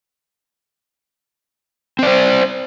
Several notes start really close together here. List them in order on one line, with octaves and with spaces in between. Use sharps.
C4 D5 C5